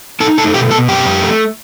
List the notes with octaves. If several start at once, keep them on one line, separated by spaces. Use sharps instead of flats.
D#4 A4 A5
A3 A4 A5
B2 G4 G5
B2 A4 A5
F#2 G4 G5
F#2
A3